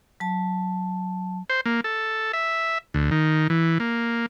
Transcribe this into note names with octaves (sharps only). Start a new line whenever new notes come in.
F#3 A5
C5
A#3
A4
E5
D2
D#3
E3
A#3